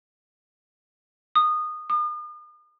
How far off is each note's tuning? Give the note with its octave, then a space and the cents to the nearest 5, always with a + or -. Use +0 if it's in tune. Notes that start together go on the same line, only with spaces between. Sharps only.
D#6 -20
D#6 -40